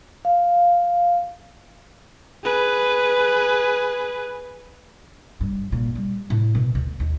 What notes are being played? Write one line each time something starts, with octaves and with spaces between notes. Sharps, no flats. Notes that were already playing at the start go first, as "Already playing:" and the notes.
F5
G#4 B4
G2
A#2
G3
A2
B2
D2
D#2